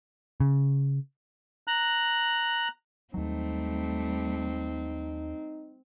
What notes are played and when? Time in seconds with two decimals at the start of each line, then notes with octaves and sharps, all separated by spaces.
0.40 C#3
1.67 A#5 F#6
3.14 D#2 F#3 G3 A3 C4 D#4